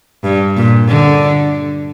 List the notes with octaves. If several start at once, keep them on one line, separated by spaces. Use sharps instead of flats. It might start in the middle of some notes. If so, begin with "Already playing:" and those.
G2
A#2
D3